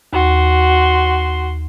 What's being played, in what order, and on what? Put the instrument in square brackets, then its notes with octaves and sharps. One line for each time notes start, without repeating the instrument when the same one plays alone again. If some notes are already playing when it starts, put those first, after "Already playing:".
[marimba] D#2 [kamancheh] F#4 C6